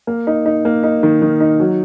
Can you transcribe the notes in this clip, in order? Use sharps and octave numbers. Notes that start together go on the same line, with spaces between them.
A#3
D#4
D#4
A#3
D#4
D#3
D#3
D#4
F#3